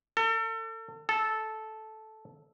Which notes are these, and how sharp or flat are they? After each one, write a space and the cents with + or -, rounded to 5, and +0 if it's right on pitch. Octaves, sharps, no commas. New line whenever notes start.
A4 +35
A4 -10